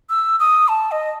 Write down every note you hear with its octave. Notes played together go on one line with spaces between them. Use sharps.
E6
D#6
A5
D#5